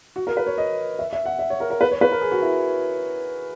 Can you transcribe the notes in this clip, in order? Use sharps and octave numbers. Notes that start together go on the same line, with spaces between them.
F#4
A#4
B4
C#5
D#5
E5
E5
F#5
E5
C#5
A#4
A#4
B4
C#5
B4
A#4
G#4
F#4
E4